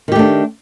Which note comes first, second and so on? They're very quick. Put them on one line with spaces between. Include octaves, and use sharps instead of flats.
D#3 G4 A3 D4